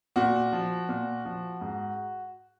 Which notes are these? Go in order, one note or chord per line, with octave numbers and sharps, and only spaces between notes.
A#2 F#4
F3
A#2
F3
G#2